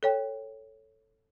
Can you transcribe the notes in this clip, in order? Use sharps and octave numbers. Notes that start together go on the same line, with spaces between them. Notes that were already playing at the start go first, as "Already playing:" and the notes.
A4 C#5 G5